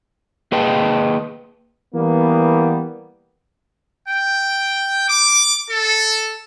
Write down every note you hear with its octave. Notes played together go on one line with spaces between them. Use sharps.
A#3 G#4 B4 D#5 G5 A5
E3 G3 A#3 B3
G5
D6
A4